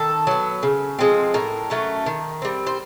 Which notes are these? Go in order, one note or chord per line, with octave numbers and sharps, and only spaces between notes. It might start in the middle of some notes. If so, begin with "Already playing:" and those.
Already playing: D#3 A4
F#3 B3
C#3
F3 G#3 C4
A2 A#4
F#3 A3 C#4
D#3
G3 C4
C5